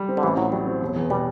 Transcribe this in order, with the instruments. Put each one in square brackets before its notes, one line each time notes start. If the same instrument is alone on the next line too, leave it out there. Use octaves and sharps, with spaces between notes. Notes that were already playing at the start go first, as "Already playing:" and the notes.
Already playing: [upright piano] G3
C4
[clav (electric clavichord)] D3
[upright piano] A1 [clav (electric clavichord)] E3
[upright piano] A2 [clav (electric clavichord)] F#3
[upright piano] F#3 [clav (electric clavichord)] G3
[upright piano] C4
E1
E2
[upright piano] B2 [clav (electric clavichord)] G3